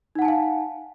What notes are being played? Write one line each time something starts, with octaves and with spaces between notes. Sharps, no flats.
D#4 F5 F#5 G#5 A5